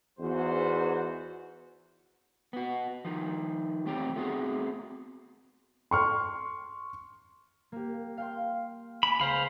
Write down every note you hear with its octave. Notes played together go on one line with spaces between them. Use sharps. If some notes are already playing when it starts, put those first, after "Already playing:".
E2 G#2 F#4 C5
B3 F#4
D#3 F3
E2 A3 C4 F4 G4 C#5
A3 B3 C4 F#4 G#4
C6 C#6 F6
A#3 G4
F5 G5 C6
G#5 B5
C#2 C5 F5 B5